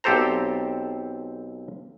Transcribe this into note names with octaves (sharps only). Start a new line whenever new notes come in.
B1 C4 G4 A4 C5 A#5